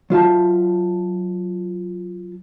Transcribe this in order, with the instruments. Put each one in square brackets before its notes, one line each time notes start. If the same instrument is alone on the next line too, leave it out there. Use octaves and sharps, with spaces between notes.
[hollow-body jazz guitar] F#3 F4 E5 A5